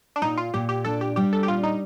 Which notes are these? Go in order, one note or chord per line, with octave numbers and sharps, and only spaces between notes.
D4
A#2 D#4
F4
A#2 G4
G4
D4 A4
G4
G3 G4
A4
G4
A#2 F4
D#4